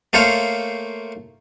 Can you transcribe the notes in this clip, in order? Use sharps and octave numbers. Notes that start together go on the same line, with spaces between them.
A3 A#3 A4 C5 C#5 F5